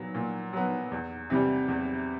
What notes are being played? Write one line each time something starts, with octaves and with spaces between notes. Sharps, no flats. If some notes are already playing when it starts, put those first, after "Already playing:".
Already playing: A#2 F#3 B3
A#2
F#3 B3
E2
C3 E3 G3
E2